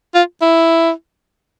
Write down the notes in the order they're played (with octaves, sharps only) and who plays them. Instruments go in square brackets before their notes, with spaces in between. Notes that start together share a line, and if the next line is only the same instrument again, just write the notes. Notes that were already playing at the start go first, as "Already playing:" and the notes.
[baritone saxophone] F4
E4